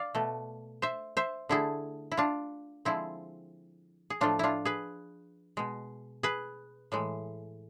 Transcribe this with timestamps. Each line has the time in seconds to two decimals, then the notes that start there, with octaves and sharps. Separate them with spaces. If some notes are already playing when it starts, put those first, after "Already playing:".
Already playing: D5 F5
0.15 B2 A3
0.82 C5 E5
1.17 C5 E5
1.49 D3 A3 E4 G#4
2.12 E4
2.17 D4 F4
2.85 D3 F3 G#3 C4 E4
4.10 G#4
4.21 A2 F3 A3 D4 F4
4.39 D4 E4 F4
4.65 G#4 B4
5.57 B2 G#3
6.23 G#4 B4
6.92 A2 E3 G#3